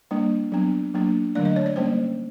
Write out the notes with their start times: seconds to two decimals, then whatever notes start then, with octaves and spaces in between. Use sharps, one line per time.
0.11 G3 A#3 D4
0.52 F#3 B3 D4
0.94 F#3 A#3 D4
1.35 D3 F#3 A3 D4 D5
1.45 D#5
1.56 C#5
1.66 D5
1.76 G3 A#3 C#4 C5